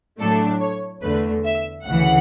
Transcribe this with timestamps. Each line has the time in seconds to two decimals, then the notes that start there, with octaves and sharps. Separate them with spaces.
0.19 A2 F#3 A3 D4 A4
0.61 C#5
1.02 E2 D3 A3 B4
1.45 E5
1.86 D2 C#3 E3 F#5